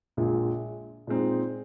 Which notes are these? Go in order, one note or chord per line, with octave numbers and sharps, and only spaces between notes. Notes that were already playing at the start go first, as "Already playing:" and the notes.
A#1 A#2 G#3
A#2 G#3 C4 D#4